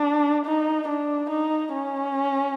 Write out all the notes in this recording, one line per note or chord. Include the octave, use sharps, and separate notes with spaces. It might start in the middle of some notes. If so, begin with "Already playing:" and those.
Already playing: D4
D#4
D4
D#4
C#4